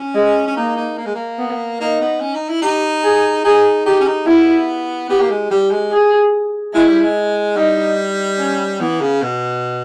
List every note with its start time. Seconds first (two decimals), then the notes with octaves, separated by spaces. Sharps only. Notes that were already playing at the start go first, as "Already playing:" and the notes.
Already playing: C#4
0.14 G#3
0.47 C#4
0.56 A#3 D#4
0.76 D#4
0.98 A#3
1.06 G#3
1.15 A#3
1.39 B3
1.80 A#3 D#4
2.01 B3
2.21 C#4
2.34 D#4
2.48 E4
2.62 D#4 G4
3.04 G#4
3.44 D#4 G#4
3.86 D#4 G4
4.00 C#4
4.07 D#4
4.26 B3 E4
5.09 B3 G4
5.21 A#3
5.30 G#3
5.51 G3 G4
5.71 G#3
5.92 G#4
6.74 G#3 E4
6.88 G3
7.02 G#3
7.56 G3 D#4
8.38 C#4
8.80 E3 B3
9.01 C#3
9.22 B2